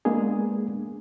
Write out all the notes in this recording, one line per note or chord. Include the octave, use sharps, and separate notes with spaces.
G#3 A#3 B3 D4 G#4